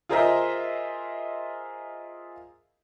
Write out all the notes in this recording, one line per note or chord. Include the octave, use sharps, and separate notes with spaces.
F4 G#4 A#4 C5 D#5 E5